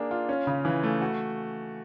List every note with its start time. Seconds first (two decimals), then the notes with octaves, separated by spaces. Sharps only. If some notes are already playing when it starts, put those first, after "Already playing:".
Already playing: A#3 D4 G#4
0.11 F4
0.29 C#4
0.47 C#3
0.65 E3
0.83 A3
1.01 F#4